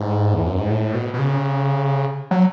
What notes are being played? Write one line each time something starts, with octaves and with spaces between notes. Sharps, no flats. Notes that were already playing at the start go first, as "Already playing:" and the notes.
Already playing: G#2
E2
F#2
G#2
A2
B2
B2
C#3
F#3